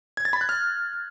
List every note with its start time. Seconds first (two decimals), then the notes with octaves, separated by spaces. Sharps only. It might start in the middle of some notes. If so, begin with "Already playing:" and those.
0.17 G#6
0.25 A6
0.33 B5
0.41 F#6
0.49 F6